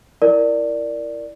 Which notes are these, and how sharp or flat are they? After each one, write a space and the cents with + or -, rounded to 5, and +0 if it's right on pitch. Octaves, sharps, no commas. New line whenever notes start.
E4 +0 A#4 -5 D5 +0